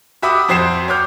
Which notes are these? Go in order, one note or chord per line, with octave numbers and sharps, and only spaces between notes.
F#4 G4 E5 B5 D6 D#6
F2 F#4 C5 G5 C7 E7
C#5 D6 F6 G6